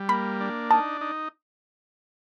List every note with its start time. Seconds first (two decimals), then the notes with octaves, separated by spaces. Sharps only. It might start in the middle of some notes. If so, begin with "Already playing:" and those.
Already playing: G3
0.09 A#3 B5
0.40 D4
0.70 D#4 A5
1.01 D#4